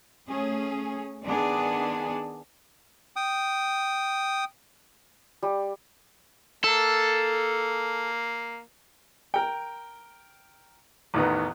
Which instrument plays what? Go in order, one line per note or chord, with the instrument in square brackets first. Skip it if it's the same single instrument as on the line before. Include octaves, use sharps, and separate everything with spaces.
[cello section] A3 C#4 G#4
D#3 B3 D4 G#4
[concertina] G5 D#6
[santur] G3
[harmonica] A#3 [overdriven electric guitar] A4
[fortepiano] A#4 G5
A1 E2 D#3 B3